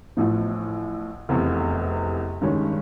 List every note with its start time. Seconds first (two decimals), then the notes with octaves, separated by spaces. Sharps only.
0.17 A1 A2 F3
1.29 F1 E2 C3
2.41 G2 D#3 G#3 C#4